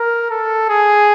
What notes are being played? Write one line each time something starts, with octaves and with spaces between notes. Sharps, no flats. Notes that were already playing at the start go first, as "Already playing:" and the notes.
Already playing: A#4
A4
G#4